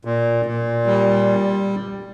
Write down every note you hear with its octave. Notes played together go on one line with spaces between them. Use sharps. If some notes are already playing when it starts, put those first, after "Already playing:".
A#2
A#2
G3